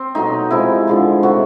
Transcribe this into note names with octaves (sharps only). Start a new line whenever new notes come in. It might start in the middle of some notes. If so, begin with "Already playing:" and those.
Already playing: C4
B2 F#3 A3 D#4
C3 F3 G#3 E4
D3 F3 G#3
C3 D#3 F#3 A3 F#4